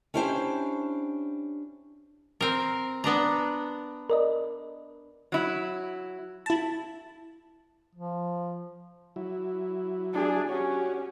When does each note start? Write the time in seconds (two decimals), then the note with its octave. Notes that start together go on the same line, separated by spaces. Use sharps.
0.14 C#4 D4 E4 G4 C5
2.41 C4 A#4
3.04 B3 D4 A#5
4.10 A#4 D5 D#5
5.32 F#3 E4
6.46 E4 A5
7.95 F3
9.16 F#3 E4
10.13 D4 G#4
10.49 C#4 F#4 G4 C#5